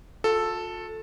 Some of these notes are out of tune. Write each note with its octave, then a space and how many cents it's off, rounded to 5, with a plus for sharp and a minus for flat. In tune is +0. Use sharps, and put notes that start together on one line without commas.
F4 +45 A4 +0